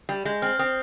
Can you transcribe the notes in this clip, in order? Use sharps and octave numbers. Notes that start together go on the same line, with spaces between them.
G3
G#3 G6
C4 F6
C4 D#6